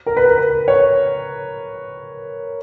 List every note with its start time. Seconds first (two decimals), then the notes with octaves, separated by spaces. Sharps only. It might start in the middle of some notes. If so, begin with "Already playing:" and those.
0.06 A#4
0.17 B4
0.25 A#4
0.38 B4
0.68 C#5